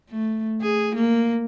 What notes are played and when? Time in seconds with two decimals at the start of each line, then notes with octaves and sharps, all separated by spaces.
0.10 A3
0.62 G#4
0.95 A#3